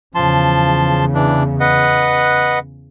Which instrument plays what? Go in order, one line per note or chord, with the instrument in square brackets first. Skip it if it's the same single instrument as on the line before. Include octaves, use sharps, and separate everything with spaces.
[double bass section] E2 C#3 [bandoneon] F3 A5 C6
[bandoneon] E3 D4
B4 D#5 F#5